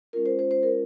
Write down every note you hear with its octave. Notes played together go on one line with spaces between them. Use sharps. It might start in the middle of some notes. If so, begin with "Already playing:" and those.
G#3 C#4 F4 A#4
C5
C5
C5
A#4